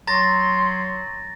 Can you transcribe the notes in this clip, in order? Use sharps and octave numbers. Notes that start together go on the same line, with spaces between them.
F#3 A#5 C6 A6 A#6